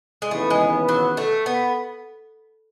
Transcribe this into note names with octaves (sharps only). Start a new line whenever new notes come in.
G#3
D#2 C#3 E3 A3 B3
G#3
F#3
A3
B3